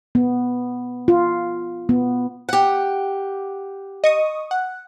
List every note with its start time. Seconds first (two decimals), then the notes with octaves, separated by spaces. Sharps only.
0.15 B3
1.08 F4
1.89 B3
2.49 G4 F#5
4.04 D#5 C#6 D#6
4.51 F#5